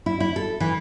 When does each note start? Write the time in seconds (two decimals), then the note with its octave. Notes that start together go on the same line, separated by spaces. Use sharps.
0.06 E4
0.20 E4
0.36 A4
0.60 E3